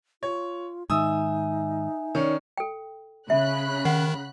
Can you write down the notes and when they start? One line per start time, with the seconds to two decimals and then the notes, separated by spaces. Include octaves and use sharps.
0.23 F4 C#5
0.90 G#2 D#3 D#4 E5 G#5 D#6 E6
2.15 D#3 C#4 C#5 D5
2.57 A4 G5
3.30 C#3 E5 B5 F#6
3.85 D#3 F#5